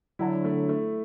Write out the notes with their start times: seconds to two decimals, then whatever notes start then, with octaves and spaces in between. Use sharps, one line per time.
0.19 D3 F#3 E4
0.44 A3
0.69 A3